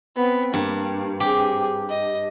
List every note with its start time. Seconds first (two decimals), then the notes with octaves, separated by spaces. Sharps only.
0.16 B3 C4
0.54 G2 A#3
1.20 C4 G4 G#4
1.90 D#5